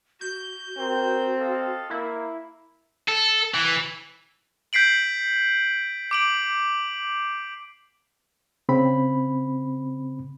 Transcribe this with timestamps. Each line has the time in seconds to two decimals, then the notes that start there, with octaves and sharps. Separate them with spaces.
0.21 F#4 G6
0.78 C4 A#4
1.38 A4 D#5 F5
1.90 A#3 E4
3.08 A4
3.54 E3
4.73 G6 B6 C7 D7 F#7
6.11 D6 D7 F#7
8.69 C#3 C4 B5